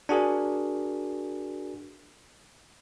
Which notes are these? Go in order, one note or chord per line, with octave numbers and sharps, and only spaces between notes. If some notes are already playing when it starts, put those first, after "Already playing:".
D4 F#4 G#4 A#4